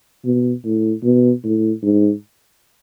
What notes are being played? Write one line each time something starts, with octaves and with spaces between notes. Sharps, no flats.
B2
A2
B2
A2
G#2